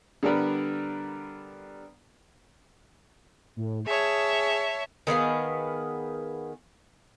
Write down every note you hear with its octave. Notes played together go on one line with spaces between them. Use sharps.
D3 G3 B3 D4 A#4 B4
A2
G#4 C#5 E5 A5
D#3 B3 G#4 F5